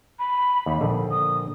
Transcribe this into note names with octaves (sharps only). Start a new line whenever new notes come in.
B5
D#2
A#1 D3
D#6